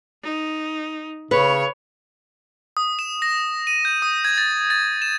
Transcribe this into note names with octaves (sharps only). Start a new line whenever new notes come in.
D#4
C#3 B4 C#5
D#6
E7
A#6
D#7
G6
D#6
G#6
A6
A6
E7